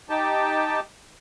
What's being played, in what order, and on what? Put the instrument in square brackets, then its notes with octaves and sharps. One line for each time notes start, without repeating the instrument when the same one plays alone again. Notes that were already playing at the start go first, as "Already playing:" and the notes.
[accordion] D#4 G4 G5 A5